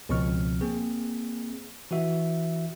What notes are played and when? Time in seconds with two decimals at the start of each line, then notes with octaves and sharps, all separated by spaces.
0.09 C#2 B2 F3 C4 C#6 F6
0.61 A#3 C4 G#4
1.91 E3 F#4 E5